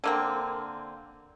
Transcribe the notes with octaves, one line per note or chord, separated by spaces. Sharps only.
D3 A#3 C4